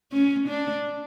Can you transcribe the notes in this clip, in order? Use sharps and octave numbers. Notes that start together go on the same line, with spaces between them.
C#4
D4